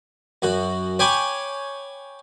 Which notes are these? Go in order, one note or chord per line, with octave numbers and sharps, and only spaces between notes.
F#2 F#4
C#5 G5 G#5 B5 C#6 D6